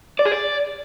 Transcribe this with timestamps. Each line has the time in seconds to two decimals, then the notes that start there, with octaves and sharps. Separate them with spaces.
0.19 D5
0.26 G#4
0.32 D5